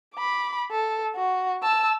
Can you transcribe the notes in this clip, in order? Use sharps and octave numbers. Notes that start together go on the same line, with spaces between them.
B5 D6
A4
F#4
A5 E6